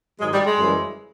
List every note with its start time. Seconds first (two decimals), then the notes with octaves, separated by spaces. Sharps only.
0.20 G#2 D#3 F#3 G#3
0.33 G3
0.46 G#3
0.59 F#2 C#3 E3 G3